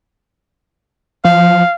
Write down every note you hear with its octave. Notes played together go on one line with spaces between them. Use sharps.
F3 F5